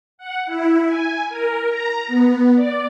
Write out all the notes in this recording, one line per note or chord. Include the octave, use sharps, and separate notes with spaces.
F#5
E4
G#5
A#4
A#5
B3
D5